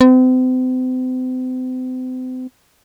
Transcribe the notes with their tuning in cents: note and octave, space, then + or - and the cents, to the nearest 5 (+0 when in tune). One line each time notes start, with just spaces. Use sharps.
C4 -40